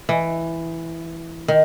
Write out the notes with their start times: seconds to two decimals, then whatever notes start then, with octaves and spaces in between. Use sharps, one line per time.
0.09 E3
1.48 D#3